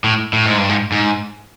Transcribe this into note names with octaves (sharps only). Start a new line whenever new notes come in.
A2
A2
G#2
G2
G#2
G#2